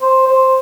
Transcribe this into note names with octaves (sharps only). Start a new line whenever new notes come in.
C5
C5